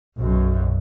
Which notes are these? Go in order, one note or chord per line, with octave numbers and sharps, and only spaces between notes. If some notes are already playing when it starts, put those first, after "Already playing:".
B1 F#2